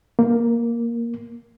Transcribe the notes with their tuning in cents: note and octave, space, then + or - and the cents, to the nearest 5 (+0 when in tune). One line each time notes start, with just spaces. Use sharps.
A#3 +5